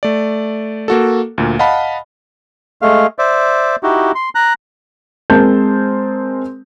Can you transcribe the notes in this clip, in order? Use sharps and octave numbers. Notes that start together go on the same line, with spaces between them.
A3 D5
A#3 F#4 A4
D2 A#2
D#5 F5 F#5 A5 B5
G#3 A3 F5
C5 D5 E5
D#4 E4 F#4 G4
C6
A#5 F#6
G#3 C4 A#4 C5 A5 G6